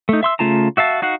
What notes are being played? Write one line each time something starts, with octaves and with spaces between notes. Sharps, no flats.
A3 D#4
E5 C6 E6
C#3 A3 F4 A5 A#5
F#4 E5 F5 A5
D#4 F#4 F5 F#5